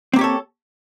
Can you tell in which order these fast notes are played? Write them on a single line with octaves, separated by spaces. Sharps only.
C4 A#3 G4 C#5 A4